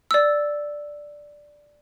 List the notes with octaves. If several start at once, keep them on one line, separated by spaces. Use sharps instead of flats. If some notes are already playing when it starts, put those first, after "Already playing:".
D5 E6